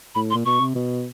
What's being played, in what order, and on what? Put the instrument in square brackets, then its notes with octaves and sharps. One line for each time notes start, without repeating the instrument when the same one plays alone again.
[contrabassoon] A2 [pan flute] B5
[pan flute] C6
[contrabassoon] A#2
[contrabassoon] B2 [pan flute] C#6
[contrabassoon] C3
B2